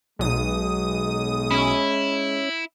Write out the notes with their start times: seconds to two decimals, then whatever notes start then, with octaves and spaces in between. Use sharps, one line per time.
0.19 B1 G#3 D#6
1.51 C#4 E4